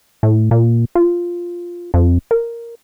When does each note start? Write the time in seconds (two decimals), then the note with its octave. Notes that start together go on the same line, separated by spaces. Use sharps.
0.23 A2
0.51 A#2
0.95 F4
1.94 F2
2.31 A#4